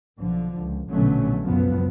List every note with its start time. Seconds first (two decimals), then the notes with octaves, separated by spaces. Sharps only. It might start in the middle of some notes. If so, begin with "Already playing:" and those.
0.19 B1 D3 F3
0.61 C#2
0.90 A#1 B2 D3 F#3 A3 C#4
1.44 F#1 C#2 F#2 F3 F#3 B3